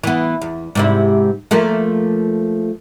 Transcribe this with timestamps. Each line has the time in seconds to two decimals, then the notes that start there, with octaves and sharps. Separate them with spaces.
0.04 E3 B3
0.41 E2
0.75 G#2 C3 E4
1.51 F3 A3 A#3